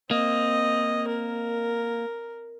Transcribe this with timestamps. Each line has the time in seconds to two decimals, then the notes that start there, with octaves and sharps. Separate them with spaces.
0.11 A#3 C4 D#5
1.08 A#4